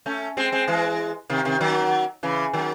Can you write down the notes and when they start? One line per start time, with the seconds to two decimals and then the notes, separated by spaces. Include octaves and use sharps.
0.06 A3 C#4
0.37 G#3 C4
0.52 G#3 C4
0.68 E3 G#3
1.30 C3 D#3
1.45 C3 D#3
1.60 D#3 F#3
2.23 C#3 E3
2.53 D#3 F#3